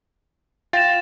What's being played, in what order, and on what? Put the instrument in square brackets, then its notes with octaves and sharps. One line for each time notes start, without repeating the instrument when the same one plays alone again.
[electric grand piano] F4 F5 G5 [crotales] A6 A#6 E7